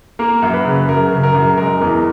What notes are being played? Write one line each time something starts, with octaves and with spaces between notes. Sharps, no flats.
A#3 A#4
F#2
B4
C#3
F#2 A#4
C#3
A#4
F#2
G#3 A#4
E2